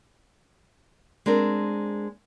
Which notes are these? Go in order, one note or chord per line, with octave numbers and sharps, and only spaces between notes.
G#3 C4 D4 A#4